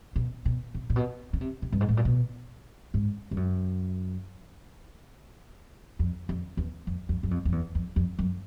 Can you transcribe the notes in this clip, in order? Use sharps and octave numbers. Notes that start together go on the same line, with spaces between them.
B2
B2
C3
A#2
B2
C#3
C3
C3
G2
G#2
A2
A#2
B2
G#2
G2
F#2
F2
F2
E2
F2
F2
F#2
F2
F2
E2
F2
F2
F#2